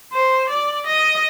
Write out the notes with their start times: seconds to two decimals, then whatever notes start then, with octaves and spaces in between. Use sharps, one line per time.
0.13 C5
0.49 D5
0.86 D#5